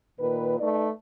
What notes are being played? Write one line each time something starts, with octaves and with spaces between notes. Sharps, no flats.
A#2 D#3 B4
A3 D#4 B4 D5